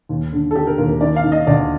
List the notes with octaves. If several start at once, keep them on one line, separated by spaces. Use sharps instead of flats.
D#2
D3
A4
D3 G4
A#4
D#2 A#4
A#4
D#3 D5
F5
D#3
D#5
D2 D5